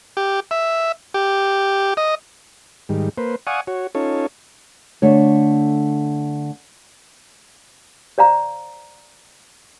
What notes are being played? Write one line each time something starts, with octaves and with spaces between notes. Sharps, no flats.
G4
E5
G4
D#5
G#2 D#3 G3
A#3 B4 C5
D5 F5 F#5 G#5 C#6 D#6
F#4 C#5
C#4 D#4 F4 A4 C#5
D3 A3 C#5
C5 D5 F5 A#5